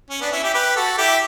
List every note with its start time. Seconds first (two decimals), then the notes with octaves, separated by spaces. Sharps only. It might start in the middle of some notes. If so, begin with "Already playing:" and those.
0.10 C#4
0.21 B3 D4
0.32 C#4 E4
0.44 E4 G4
0.54 G4 B4
0.76 F#4 A4
0.98 E4 G4